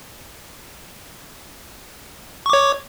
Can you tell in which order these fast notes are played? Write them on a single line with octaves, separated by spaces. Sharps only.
C#6 D6 C#5